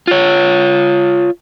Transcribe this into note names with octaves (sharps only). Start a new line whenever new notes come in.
F4 C#5